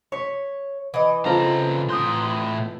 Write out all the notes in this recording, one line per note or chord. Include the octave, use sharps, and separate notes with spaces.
C#5 C#6 B6
E3 D#5
C#3 C4 F4 A4 A#5
A2 C6 D#6 G6 A#6